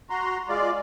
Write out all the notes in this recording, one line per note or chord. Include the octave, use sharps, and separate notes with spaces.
F#4 A#5 C6
G#3 F4 D5